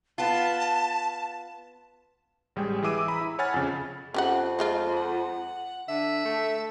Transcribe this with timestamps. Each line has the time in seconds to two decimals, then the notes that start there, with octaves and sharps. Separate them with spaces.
0.18 B3 F4 A5
2.56 A1 G3 G#3 G#4 G5
2.82 E3 G#4 E5 D6 E6 D#7
3.08 A#5 B5
3.21 E4
3.39 C#5 F#5 G#5 B5 F6 A6
3.54 F2 C#3
4.14 F2 C#4 G4 F#5
4.59 F3 G#3 F4
4.97 F#5
5.89 D3 E5
6.25 A3